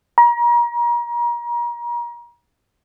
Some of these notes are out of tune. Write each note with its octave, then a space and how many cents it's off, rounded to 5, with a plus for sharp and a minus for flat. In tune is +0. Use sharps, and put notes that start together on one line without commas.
A#5 +35